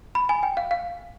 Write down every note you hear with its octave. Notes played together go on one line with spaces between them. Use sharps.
B5
G#5
G5
F5
F5